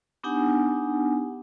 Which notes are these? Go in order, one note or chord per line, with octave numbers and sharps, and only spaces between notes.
B3 D4 D#4 G4 F#5 G#5